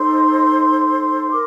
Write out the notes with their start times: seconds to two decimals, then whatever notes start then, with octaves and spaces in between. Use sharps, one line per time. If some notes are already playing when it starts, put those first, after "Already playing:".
Already playing: D#4 A4 C5 C6
1.30 A#4 D6